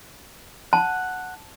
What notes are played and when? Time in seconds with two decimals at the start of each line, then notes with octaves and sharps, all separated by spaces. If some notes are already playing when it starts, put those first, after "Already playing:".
0.73 F#5 A5